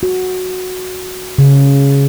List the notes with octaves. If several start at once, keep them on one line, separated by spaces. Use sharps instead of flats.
F#4
C#3